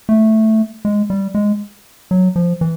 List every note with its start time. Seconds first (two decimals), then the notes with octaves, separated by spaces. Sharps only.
0.09 A3
0.85 G#3
1.10 G3
1.35 G#3
2.11 F#3
2.36 F3
2.61 E3